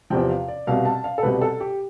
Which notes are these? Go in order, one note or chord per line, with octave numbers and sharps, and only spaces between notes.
E2 C3 F3 G5
F5
D5
C2 B2 G3 F5
A5
F5
A4
C2 B2 G3 B4
A4
G4